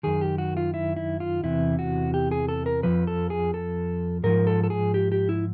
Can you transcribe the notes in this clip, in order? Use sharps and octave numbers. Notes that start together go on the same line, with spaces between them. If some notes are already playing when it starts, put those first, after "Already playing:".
F#2 D#3 G#4
G4
F#4
F4
E4
E4
F4
E2 C3 E3 E4
F#4
G4
G#4
A4
A#4
F2 C#3 F3 B4
A4
G#4
A4
G#2 F3 A#4
A4
A4
G#4
G4
G4
E4